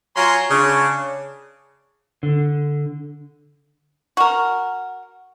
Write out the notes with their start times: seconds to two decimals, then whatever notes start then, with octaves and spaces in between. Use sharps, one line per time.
0.16 F#3 F4 F5 G#5 A#5 C6
0.50 C#3 D4
2.23 D3
4.17 F#4 A#4